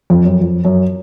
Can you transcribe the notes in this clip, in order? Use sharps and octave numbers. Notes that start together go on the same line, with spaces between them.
F2
F#2
F2
F#2